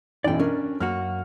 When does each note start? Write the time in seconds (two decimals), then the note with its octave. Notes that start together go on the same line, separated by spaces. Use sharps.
0.24 B1 F#2 E3 D5 G5
0.39 C#4 D4 A#4
0.80 F#2 A#3 F#4 F6